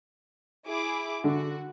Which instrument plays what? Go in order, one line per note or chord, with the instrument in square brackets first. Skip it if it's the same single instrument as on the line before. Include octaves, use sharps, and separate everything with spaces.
[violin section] E4 G#4 D6
[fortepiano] D3 [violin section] F#4